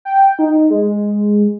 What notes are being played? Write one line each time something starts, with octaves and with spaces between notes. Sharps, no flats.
G5
D#4
G#3